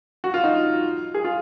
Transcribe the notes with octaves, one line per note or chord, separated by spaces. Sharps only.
F#4
F4
D#4
G#4
F4